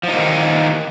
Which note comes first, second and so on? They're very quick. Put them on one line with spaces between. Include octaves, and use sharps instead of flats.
F3 D#4 A#3 D#3